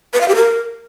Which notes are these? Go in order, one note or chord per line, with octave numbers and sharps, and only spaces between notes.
B4
F5
G4
A#4